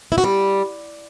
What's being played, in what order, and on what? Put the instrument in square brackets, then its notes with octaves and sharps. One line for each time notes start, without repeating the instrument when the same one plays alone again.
[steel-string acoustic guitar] E4
F#4
G3